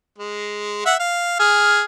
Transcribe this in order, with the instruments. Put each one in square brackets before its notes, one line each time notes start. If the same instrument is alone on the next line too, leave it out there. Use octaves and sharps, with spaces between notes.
[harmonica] G#3
E5 F#5
F5
G#4 F6